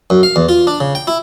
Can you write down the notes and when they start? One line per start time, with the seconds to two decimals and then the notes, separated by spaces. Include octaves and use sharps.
0.10 F#2
0.23 F5
0.36 E2
0.49 F4
0.67 D4
0.80 C#3
0.95 G5
1.07 E4